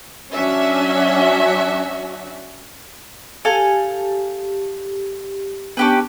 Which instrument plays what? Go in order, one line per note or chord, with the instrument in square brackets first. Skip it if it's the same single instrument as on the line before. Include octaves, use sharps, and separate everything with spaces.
[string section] F#3 C#4 D4 F#4 E5
[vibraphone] G4 [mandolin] A4 F5 G#5
[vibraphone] B3 D4 A5 [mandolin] C#4 G4 B4